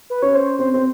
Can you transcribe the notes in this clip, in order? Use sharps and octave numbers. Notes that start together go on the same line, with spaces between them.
B4
C#4 C#5
C5
C4 C5
C4 C5